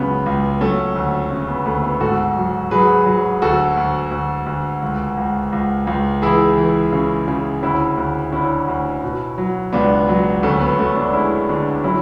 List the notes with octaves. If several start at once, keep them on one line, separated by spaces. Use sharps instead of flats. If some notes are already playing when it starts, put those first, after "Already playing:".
Already playing: C#2 C#3 F#3 B3
C#2
F#3 A3 C#4
D2
C#3
B3
D2 A3
B3
G#2 F#4 A4
F#3
F#3 G#4 B4
F#3
D2 F#4 A4
D2
D2
D2
C#2
C#2
C#2
C#2
E3 E4 G#4
E3
C#3
C#3
D2 C#4 E4
D2
D3 C#4 E4
D2
B2
F#3
C#2 B3 D4
F#3
D2 A3 C#4
B3
D2 A3 C#4
B3 D4
G#3 C#4 E4
D3
F#3 C#4 E4